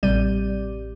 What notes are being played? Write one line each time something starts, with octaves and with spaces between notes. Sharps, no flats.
A1 C3 G3 D5 G6 D#7